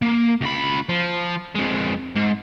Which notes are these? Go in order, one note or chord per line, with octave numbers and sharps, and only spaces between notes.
A#3
C#2 B5
F3
F2 G#3
G#2